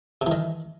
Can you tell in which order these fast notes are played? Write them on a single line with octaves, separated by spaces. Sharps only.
C3 E3 D#3